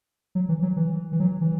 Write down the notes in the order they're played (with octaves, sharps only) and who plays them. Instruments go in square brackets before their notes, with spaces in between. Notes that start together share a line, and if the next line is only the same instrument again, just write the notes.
[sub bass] F#3
E3
F#3
E3
E3
F#3
E3